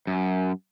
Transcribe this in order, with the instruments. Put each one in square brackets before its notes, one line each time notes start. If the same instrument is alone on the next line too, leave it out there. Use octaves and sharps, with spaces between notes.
[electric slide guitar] F#2